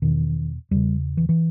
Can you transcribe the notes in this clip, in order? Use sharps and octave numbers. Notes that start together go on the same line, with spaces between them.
E2 B2 D#3
E2 C#3 G3
E3
E3